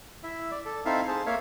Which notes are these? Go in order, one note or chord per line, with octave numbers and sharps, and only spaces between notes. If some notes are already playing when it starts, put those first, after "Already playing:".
E4 E5
D5
A4
C4 D#4 E4 A4 E5 F5
G#4 C5 A5
A#3 C#5 E5 F5